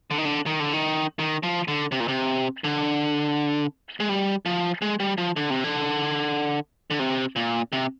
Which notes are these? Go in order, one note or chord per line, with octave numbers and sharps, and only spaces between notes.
D3
D#3
D3
D#3
D3
D#3
D#3
F3
D3
C3
A#2
C3
D3
G#3
G3
F3
G#3
G3
F3
D3
C3
D3
D3
C3
A#2
C3